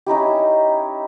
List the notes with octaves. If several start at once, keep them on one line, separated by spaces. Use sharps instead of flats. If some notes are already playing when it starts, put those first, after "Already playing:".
C#4 D#4 E4 G4